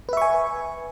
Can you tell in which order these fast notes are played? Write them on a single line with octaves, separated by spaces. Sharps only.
B4 E5 C#6 G#5